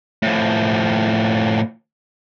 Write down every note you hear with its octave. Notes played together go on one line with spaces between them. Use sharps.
A2 F3